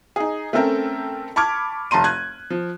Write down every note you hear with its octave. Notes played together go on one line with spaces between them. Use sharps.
D#4 G#4
A3 C4 C#4 A4 A#4 G5
A5 B5 C#6 D6 F6 G#6
F1 A5 A#5 C6 D#7
F#6 G#6
F3